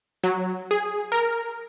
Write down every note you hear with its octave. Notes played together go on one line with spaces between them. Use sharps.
F#3
G#4
A#4